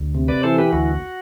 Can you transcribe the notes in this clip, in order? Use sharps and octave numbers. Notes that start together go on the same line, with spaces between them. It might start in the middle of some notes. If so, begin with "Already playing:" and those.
Already playing: D2
C3
B4 D5
E3 A4 C5
G4 B4
D2 F#4